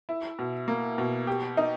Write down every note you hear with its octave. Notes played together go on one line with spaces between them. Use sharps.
E4
B2
A#3
B2
G4
D#4